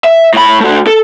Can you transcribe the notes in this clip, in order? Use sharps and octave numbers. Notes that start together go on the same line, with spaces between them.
E5
A2 B5
A3 F#4
A4